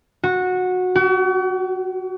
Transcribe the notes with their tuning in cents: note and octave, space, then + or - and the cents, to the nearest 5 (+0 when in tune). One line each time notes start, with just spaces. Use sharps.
F#4 -15
F#4 +40